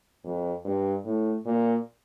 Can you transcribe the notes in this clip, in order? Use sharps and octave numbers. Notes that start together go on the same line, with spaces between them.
F2
G2
A2
A#2